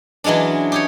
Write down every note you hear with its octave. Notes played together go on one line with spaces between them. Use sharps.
E3 F#3 G#3 C#4 D4
G4 G#4 C#5